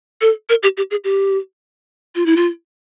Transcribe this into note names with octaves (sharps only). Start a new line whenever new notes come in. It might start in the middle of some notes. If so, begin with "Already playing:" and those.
A4
A#4
G4
G4
G#4
G4
F4
E4
F4